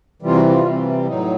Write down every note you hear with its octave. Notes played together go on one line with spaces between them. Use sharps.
C3 E3 G3 F4
F#4
F4
C3 E3 G3
A2 F#3 D#4